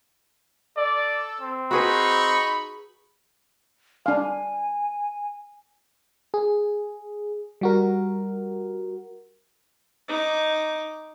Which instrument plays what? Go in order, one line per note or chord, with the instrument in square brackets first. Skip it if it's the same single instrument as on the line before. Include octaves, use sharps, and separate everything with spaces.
[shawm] A4 [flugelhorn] D5
[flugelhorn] C4
[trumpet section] D#4 C#6 [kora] F#4 G#4 B4 [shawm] B5
[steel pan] D4 F5 [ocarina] G#5
[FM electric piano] G#4
G3 F#4 A#4
[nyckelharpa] D#4 D6